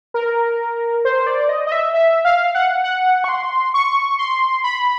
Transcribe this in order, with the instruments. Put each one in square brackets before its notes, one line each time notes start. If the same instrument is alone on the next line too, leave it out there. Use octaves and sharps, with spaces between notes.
[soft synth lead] A#4
C5
D5
D#5
D#5
E5
E5
F5
F#5
F#5
C#6
C6
C#6
C6
B5